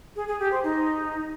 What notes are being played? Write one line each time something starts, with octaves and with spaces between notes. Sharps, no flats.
G#4
G#4
G4
C5
D#4